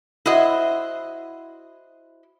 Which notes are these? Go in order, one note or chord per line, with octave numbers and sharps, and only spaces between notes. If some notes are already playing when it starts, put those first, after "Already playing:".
E4 F#4 C5 D#5